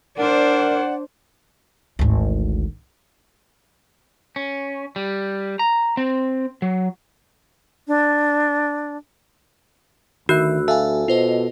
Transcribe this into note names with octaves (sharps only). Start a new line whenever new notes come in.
D4 A#4 C5 D5 F#5
G#1 D2
C#4
G3
A#5
C4
F#3
D4
D2 D#3 F#4 E5 E6 F#6
A4 E5 F5 G#5
B2 F4 C5 D#5